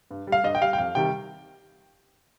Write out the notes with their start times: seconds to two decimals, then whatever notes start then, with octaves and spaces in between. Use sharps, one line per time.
0.11 G2
0.27 G3
0.32 F5
0.44 G2 D#5
0.55 G5
0.62 G3 F5
0.73 G5
0.78 F2 F5
0.95 C3 D#3 G3 G5